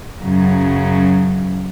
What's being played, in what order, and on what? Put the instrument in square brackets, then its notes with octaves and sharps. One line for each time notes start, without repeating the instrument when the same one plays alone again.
[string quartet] F#2 C#3 F#3